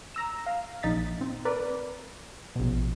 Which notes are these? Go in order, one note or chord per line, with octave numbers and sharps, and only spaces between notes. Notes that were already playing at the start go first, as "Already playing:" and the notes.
A#5 E6 E7
F5
A#1 D#4 A6 B6
C4
A#4 B4 D5
A#1 B2